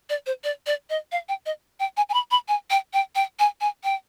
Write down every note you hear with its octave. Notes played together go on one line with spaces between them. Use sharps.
D5
C5
D5
D5
D#5
F5
G5
D#5
G5
G#5
G#5
B5
B5
G#5
G5
G5
G5
G#5
G#5
G5